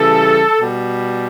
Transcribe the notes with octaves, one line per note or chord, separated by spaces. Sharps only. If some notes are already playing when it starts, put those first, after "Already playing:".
Already playing: C#3 E3 G3 A4
B2 G3